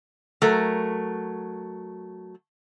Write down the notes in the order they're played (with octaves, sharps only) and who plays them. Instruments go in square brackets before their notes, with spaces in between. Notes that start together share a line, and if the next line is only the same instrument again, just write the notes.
[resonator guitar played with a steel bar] F#3 A3 A#4